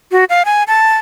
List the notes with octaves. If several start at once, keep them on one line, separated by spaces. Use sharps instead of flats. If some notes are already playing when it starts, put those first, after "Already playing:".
F#4
F5
G#5
A5